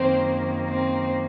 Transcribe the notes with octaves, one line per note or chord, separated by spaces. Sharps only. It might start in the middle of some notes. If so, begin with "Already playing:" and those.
Already playing: F#2 D#3 A#3 C4 C5
C4 C5